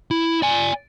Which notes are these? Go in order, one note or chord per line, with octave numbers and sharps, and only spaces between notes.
E4
D5 G#5